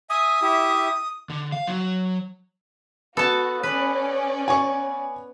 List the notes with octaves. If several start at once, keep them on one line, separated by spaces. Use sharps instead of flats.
E5 G#5 D#6
E4 G4 E5
D3
F5
F#3
B3 F#4 A4 A5
C#4 B4 D5
G#5 C#6